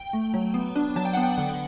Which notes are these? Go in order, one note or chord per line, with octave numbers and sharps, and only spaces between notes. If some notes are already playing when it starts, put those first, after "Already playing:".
Already playing: G5
A3
F#3
B3
D4
F#3 A5
G5
B3 F#5
G5
D3 F#5